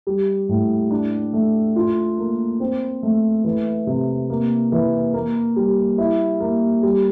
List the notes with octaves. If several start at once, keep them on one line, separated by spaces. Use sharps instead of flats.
G3
A2
D4
A3
F4
A#3
C4
A3
E3
C3
A#3
E3
A#3
G3
E4
A#3
G3